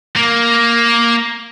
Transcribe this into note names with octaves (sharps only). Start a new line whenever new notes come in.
A#3